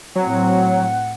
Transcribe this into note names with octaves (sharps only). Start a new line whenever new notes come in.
A2 F#3 C4 F#5